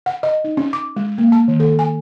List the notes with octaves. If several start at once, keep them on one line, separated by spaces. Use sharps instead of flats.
F#5
D#5
D#4
C#4
D6
G#3
A#3
A5
D#3
A4
G#5